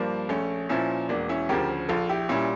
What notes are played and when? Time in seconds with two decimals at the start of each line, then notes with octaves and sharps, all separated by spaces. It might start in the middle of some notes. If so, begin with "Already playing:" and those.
Already playing: G2 F3 A#3 D4
0.29 A#1 A3 C#4
0.69 A#2 F3 C#4 E4
1.09 E1 A#3 D4
1.29 C#4 E4
1.49 D2 C#3 F3 G4 A#4
1.89 A#1 F4 A4
2.09 E4 G4
2.29 A#2 G3 C#4 E4